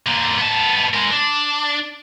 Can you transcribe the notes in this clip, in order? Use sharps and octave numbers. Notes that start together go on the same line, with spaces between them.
D3 A#3
B3 A5
G#3 A#4
D4